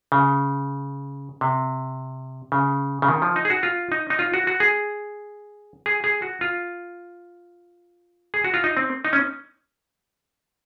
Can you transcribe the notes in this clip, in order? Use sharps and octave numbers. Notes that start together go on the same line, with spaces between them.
C#3
C3
C#3
C#3
D#3
F3
D#4
G#4
F#4
F4
D#4
D#4
F4
F#4
F#4
G#4
G#4
G#4
F#4
F4
G#4
F#4
F4
D#4
C4
D#4
C#4